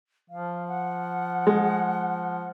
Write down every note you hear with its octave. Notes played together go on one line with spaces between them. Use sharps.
F3 F5
F#5
G#3